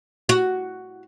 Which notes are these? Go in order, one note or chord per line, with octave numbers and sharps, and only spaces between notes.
F#4